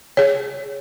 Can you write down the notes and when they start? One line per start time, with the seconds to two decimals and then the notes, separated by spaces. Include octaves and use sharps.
0.17 G#4 C#5